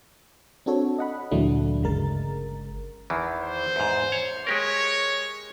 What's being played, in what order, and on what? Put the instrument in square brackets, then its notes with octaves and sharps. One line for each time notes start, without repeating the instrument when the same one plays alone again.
[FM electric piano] C4 D4 F#4 A4 C#5
D#5 F#5 B5
D2 A#2 E3 F#3 A3 D4
G1 C#3 G#3 A#4 A6
[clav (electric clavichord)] E2 D#3 E3
[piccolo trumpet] C5
[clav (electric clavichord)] E2 G#2
C#5
[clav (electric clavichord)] G#3 G4 A#4 [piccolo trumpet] C#5